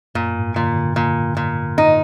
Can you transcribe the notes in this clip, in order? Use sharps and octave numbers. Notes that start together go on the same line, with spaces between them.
F#2 A#2
G#2
A#2 D3
D3
A#2
A#2
D#4